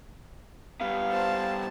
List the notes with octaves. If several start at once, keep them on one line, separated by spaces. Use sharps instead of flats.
G3 B3 F5
C5 A5